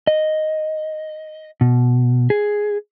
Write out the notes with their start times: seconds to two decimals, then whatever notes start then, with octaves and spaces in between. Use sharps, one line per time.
0.07 D#5
1.61 B2
2.30 G#4